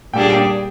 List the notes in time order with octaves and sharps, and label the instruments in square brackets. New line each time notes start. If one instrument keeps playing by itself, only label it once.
[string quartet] A#2 G3 D4 G#4 [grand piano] G5
[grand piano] G5